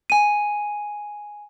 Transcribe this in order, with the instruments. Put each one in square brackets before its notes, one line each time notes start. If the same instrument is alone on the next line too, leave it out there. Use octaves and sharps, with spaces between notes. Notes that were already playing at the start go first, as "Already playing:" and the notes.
[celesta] G#5 D#7